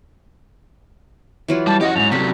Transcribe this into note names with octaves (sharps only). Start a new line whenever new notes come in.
E3 F#3 F4
G3 A5
C#4 F#4 G4 D#5 F#5
F2 G#2 F7
C3 F#3 G3 A4 B6